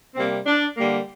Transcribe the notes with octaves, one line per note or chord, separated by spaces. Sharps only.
C3 G3 A#3 C4
D4
D3 G3 A#3